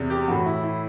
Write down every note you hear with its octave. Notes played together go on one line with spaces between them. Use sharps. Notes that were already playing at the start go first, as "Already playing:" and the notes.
Already playing: E2 C3
G4
A2 E3 F#4
E4
E4